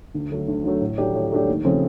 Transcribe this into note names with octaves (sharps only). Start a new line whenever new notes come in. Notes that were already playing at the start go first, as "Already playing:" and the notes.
D2
D3 F#3 A3
D2
D3 F#3 A3
A2
F#3 A3 D4 G4
A2
F#3 A3 D4 G4
D#2
C#3 F3 A3 C4